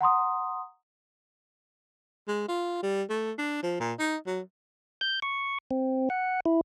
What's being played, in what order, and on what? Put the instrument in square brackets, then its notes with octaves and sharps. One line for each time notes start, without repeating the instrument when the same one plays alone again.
[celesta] F#5 A#5 C6 D#6
[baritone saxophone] G#3
F4
G3
A3
D4
F3
A#2
D#4
F#3
[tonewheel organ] G6
C#6
C4
F#5
E4